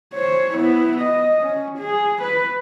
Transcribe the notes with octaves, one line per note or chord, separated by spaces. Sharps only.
C5 C#5
B3 E4
D#5
C#4
G#4
B4